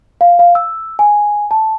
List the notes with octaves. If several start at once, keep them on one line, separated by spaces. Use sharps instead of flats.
F5
F5
E6
G#5
A5